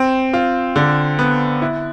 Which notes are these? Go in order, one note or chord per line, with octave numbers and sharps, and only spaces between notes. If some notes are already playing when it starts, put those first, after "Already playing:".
Already playing: C4
F4
D3
B3
E4